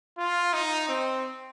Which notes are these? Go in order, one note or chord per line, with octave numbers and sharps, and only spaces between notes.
F4
D#4
C4